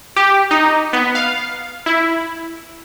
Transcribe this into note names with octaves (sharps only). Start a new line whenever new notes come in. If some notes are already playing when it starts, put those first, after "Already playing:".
G4
D#4
B3
F5
E4